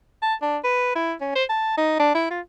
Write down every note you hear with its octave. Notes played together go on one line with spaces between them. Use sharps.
A5
D4
B4
E4
C#4
C5
A5
D#4
D4
E4
F4